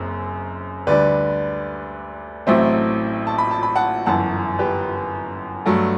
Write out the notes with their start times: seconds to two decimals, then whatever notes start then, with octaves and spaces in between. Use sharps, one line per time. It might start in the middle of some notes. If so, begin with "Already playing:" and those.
Already playing: F#1 F#2 C4
0.87 D2 D3 G3 B4 D5
2.47 A1 A2 F#3 A3 C4 C5 E5
3.27 A5
3.38 B5
3.51 A5
3.63 B5
3.75 F#5 A5
4.06 G1 F#2 E3 F#5 A5
4.59 G4 B4
5.66 G2 F#3 A3 A4